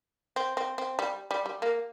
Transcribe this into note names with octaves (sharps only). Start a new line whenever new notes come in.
C4
C4
C4
G3
G3
G3
A#3